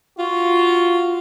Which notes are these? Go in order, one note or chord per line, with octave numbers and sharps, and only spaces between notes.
F4 F#4